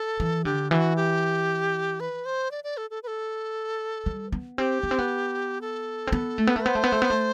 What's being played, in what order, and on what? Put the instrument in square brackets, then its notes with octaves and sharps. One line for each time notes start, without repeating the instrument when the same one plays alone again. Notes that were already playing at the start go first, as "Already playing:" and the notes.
Already playing: [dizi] A4
[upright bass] E3
[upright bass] D3 [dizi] G4
[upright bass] E3 [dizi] F#4 G4
[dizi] G4
B4
C5
D5
D5
A4
A4
B4
A4
[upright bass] G3
B3
[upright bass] C4 [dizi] G4
[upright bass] B3
C4
B3
[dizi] A4
[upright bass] C4
B3
A3
B3
A3
[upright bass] B3 [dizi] C5
[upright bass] A3
B3
A3
B3
A3